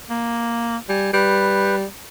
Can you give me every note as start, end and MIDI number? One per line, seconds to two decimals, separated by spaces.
0.10 0.78 58
0.89 1.10 55
0.89 1.11 80
1.13 1.85 55
1.13 1.75 71